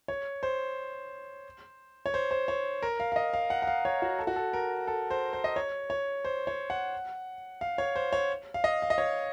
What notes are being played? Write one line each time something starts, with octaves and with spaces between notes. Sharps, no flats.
C#5
C5
C#5
C5
C5
C#5
A#4
F5
F5
D#5
F5
F#5
F#5
F5
C#5
F#4
A4
F#4
A4
A#4
A4
C5
C5
D#5
C#5
C#5
C5
C#5
F#5
F5
C#5
C5
C#5
F5
D#5
F5
D#5
C#5